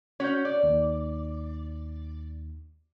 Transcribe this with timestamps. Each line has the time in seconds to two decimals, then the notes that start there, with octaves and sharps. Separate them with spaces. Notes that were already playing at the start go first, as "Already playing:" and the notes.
0.20 C#4 F#4 C#5 G6
0.45 D5
0.63 D#2